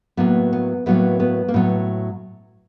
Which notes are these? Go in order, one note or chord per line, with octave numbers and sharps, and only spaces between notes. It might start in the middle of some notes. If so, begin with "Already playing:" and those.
A2 F#3 A#3 B3
B3
A2 F#3 A#3 B3
B3
A#3
A2 F#3 B3